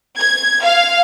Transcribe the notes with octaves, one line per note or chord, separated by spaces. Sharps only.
G#6
F5